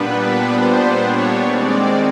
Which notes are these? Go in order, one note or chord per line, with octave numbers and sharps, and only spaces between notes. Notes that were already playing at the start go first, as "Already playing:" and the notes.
Already playing: A#2 G3 B3 D4 B4
C5
C#5
D#3 G#3 C4 D5